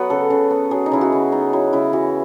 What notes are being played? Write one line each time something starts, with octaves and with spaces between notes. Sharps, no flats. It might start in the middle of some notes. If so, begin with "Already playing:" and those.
Already playing: F#3 B3 B4 F#5
C#3 A4
C#3
B3
F#3 G#4
D#4
C#3 E4
F#4
C#3
B3 D#4
F#3 E4
C#3 E4
E3 F#4